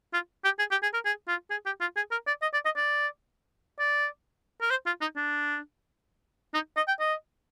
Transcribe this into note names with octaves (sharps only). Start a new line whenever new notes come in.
F4
G4
G#4
G4
G#4
A#4
G#4
F4
G#4
G4
F4
G#4
A#4
D5
D#5
D5
D#5
D5
D5
A#4
C5
F4
D#4
D4
D#4
D#5
G5
D#5